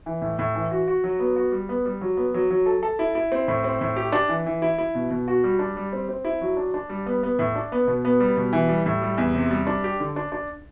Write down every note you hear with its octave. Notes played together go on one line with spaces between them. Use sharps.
E3
A2
A2
E3
F#4
F#4
F#3
B3
F#4
G3
B3
G3
F#3
B3
F#3
F#3
A4
A4
E4
E4
C4
A2
C4
A2
G4
D4
E3
E3
E4
E4
B2
B2
F#4
G3
D4
G3
C4
C4
E4
F#3
D4
D4
G3
B3
B3
A2
D4
B3
B2
B3
G3
B2
E3
G3
A2
G3
E2
C3
G3
D4
G4
D3
D4
D4